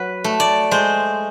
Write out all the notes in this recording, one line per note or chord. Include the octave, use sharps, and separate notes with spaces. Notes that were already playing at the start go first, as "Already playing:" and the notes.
Already playing: F#3 B4
A3
D5
G#3 C5